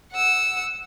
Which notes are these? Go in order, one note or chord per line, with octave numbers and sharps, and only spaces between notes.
F#5 E6